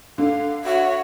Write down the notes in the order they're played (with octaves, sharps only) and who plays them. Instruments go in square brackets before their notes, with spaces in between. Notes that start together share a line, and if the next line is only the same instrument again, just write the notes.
[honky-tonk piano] D3 [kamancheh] F5
[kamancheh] F#4 C#5 [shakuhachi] E5